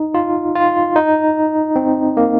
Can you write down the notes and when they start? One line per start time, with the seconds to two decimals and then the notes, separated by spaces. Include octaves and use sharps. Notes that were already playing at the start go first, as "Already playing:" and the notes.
Already playing: D#4
0.14 F4
0.55 F4
0.96 D#4
1.76 C4
2.17 A#3